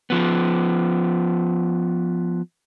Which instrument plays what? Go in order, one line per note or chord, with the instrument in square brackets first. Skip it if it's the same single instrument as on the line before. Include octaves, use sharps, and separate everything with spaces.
[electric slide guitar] F3 B3